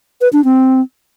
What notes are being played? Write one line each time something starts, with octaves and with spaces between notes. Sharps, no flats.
B4
D4
C4